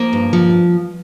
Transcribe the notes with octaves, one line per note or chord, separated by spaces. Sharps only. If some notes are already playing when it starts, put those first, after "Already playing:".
Already playing: F3 A#3
G2
F3